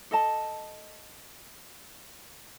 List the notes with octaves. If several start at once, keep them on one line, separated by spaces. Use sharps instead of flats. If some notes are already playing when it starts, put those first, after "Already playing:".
A4 D#5 A5